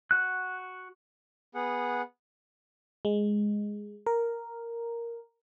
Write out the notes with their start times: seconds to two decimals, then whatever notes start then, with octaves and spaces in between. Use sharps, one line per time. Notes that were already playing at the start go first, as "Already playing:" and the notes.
0.11 F#4 F#6
1.55 B3 G#4 F#5
3.05 G#3
4.07 A#4